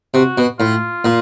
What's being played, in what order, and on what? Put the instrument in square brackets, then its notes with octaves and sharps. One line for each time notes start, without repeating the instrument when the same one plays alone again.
[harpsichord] C3 [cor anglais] F#4
[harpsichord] B2
[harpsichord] A2 [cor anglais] F4
[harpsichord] A#2